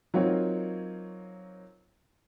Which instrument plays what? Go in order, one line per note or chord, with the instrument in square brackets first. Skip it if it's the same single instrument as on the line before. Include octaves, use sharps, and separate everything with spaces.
[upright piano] F#3 A#3 C4 D#4 F4 C#5